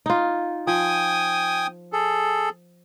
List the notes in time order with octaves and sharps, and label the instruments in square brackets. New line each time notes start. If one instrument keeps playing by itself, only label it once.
[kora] D#4 F4
[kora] F3 [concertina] G5 G#5 D#6
[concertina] G#4 A4